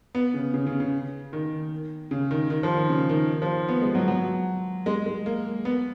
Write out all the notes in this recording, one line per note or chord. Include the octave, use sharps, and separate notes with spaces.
B3
C#3
C#3
C#3
C#3
D#3
C#3
D#3
D#3
F3
D#3
C#3
D#3
F3
B3
G#3
F#3
F#3
G#3
G#3
A#3
B3